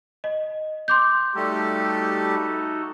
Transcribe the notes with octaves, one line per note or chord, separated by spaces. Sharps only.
D#5
C6 D6 G6
G3 A3 D#4 F#4 G4 A4